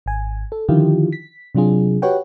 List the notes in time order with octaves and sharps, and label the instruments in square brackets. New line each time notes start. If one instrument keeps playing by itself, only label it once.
[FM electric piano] G#1 G#5
A4
D3 D#3 F3 E4 F4 G4
B6
C3 F#3 D4 F4 G#4
F#4 G4 B4 C#5 F#5 G5